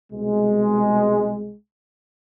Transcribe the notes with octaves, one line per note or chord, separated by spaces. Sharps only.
C2 B2 G#3